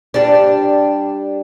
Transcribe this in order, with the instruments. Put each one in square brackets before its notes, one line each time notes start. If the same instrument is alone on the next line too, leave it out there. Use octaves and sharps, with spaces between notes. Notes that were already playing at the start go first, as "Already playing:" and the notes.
[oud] G3 D4